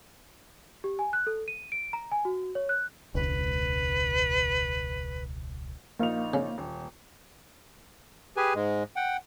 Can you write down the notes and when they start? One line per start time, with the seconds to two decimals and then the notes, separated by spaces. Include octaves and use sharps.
0.84 G4
0.99 G#5
1.13 F#6
1.27 A4
1.48 D#7
1.72 D7
1.93 A#5
2.12 G#5
2.25 F#4
2.55 C#5
2.69 F#6
3.15 E1 C#2 B4
5.99 A#1 A#3 D#4 F5 F7
6.34 C#3
6.58 D#1
8.37 G4 G#4 B4 G#5
8.55 G#2 G#3
8.96 F#5 G5